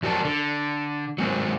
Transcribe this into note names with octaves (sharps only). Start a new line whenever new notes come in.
F2 F#3 G4 A#4 D5 A5
D3
F#3 G#3 C4